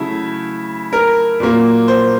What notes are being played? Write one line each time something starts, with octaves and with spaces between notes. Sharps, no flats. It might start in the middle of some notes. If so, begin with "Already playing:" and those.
Already playing: C#3 F#3 A3 E4
A#4
A#2 F#3 A#3
C5